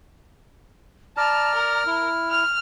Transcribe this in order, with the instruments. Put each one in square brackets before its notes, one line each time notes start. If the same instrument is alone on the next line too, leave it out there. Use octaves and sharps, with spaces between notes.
[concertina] D5 A#5 [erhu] A5 [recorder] F6
[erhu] A#4
[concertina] E4
[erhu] F6